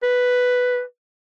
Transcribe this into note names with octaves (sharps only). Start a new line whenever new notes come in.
B4